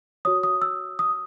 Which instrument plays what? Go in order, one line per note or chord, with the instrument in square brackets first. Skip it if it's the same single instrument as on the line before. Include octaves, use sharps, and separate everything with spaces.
[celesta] F#4 C#5 D#6
D#6
E6
D#6